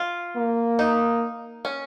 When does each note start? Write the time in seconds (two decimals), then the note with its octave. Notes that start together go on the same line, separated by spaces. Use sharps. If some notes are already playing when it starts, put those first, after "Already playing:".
Already playing: F4
0.37 A#3
0.79 D#4
1.65 C#4